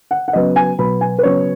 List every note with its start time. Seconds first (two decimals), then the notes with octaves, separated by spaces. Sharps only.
0.11 F#5
0.28 F#5
0.33 C#3 F#3 B3 D#5
0.56 G#5
0.78 B2 F#3 B3 B5
1.01 G#5
1.19 B4
1.23 C#3 F#3 B3 C#5